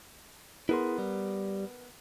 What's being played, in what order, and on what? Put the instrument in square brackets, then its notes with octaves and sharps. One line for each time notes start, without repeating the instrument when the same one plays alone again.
[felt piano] B3 A#4 [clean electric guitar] E4 G#4 C6
[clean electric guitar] G3